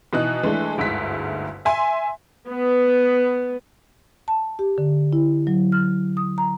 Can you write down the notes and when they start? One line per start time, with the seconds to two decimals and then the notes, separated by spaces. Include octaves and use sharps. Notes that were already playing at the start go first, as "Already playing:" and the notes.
0.13 B2 E3 D#4 F#6
0.43 E3 G#3 A3 D4
0.78 G1 D2 G#2 E4 B6
1.65 E5 G#5 C6
2.47 B3
4.28 A5
4.59 G4
4.78 D3
5.13 E4
5.47 F#3
5.72 F6
6.17 D#6
6.38 A#5